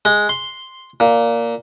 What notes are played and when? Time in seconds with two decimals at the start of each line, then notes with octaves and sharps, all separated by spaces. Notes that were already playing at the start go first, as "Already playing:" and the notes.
0.05 G#3
0.29 C6
1.00 A#2